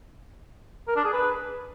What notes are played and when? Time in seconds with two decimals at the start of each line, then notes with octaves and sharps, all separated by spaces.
0.88 A#4
0.96 D4
1.05 G#4
1.13 B4